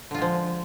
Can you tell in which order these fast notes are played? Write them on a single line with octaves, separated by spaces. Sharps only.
D3 F4 G#3 F3